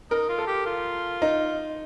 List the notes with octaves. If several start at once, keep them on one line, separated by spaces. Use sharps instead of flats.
D#4 A#4
F4
A4
G4
F4
D#4